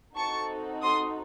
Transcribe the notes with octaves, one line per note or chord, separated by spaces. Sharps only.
C4 D#4 F#4 A4 A5 C#6
C6 D#6